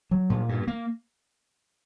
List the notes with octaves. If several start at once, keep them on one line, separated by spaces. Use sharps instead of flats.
F#3
A#2
G2
A#3